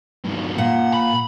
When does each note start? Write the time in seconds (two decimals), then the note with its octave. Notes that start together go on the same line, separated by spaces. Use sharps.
0.25 G2 D#3
0.58 A#2 F#5
0.94 B5